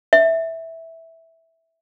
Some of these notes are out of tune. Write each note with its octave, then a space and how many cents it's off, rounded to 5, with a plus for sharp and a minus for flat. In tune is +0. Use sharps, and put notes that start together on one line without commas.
E5 -10